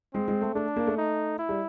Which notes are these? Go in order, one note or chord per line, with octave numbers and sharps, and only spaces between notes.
G#3 C4
G#3
A3
A3 D4
A#3
A3
D#4
E4
G3